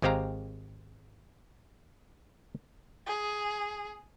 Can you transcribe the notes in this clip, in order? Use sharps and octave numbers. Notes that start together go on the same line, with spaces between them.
G#1 G#3 C4 G4 F5 A#5
G#4